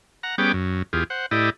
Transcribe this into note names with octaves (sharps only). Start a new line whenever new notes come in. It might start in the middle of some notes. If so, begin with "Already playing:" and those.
F#5 A#5
G3 B3 C#4 G#4 G5 D6
F#2
E2 F4 G4 G#4
C5 F#5
A2 E4 G4 D5 D#5